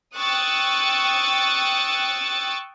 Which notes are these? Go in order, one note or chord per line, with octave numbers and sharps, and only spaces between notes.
G5 C#6 D#6 E6 F#6 A6